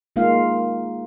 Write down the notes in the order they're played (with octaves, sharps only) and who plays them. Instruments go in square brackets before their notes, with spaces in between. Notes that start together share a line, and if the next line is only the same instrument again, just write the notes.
[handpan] G#3 A#3 D#4 F4 F5